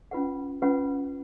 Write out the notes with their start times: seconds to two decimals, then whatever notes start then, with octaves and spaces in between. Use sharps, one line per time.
0.11 C#4 F4 B4 F#5
0.62 C#4 F4 B4 F#5